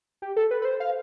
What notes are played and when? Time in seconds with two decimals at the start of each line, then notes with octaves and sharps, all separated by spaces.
0.22 G4
0.36 A4
0.51 B4
0.62 B4
0.65 C5
0.80 F5